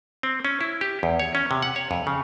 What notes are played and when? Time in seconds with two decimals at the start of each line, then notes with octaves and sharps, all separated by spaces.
0.23 C4
0.45 C#4
0.61 E4
0.81 G4
1.03 E2
1.19 C#5
1.35 C#4
1.51 C3
1.62 F#5
1.76 C#5
1.91 F2
2.07 C#3